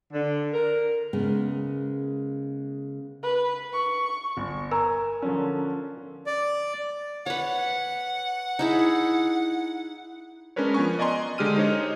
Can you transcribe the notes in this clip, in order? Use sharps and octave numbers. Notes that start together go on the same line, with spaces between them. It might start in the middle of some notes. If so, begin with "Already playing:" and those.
D3
A#4
C#3 G#3 A#3 B3
B4
C#6
G1
A#4 G#5 E6
D3 F3 C#4
D5
B4 C#5 F#5
D#4 E4 G#4
G#3 C#4 D4 A#4 B4 C#5
F3 B3 G#5 C#6
D5 D#5 G#5 A#5 C6
D3 G#3 G4 F6 D#7
D#4 C5 C#5 D#5